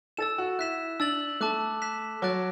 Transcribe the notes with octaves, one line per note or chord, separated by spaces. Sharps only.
A4 E6 A6 E7
F#4
E4 F#6 B6 E7
D4 E6 A6 F#7
A3 A5 D6 F#6
F#6 B6 E7
F#3 D6 F#6 A6 D7